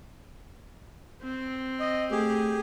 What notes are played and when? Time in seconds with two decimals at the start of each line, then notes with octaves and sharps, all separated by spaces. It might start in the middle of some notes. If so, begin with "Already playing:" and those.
1.23 C4
1.80 D#5
2.11 A3 G4 G#4